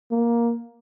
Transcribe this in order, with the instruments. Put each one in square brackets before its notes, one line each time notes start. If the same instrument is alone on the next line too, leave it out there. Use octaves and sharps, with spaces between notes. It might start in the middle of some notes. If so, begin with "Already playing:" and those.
[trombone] A#3